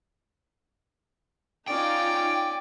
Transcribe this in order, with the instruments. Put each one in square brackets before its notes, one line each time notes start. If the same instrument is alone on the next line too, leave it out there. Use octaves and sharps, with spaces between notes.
[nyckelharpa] C#4 D5 [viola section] D#4 F4 [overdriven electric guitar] G5